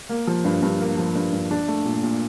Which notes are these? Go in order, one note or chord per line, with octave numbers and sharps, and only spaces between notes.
A#3
F3
G2
G2
A#3
F3
G2
G2
D4
A3
A#2
A#2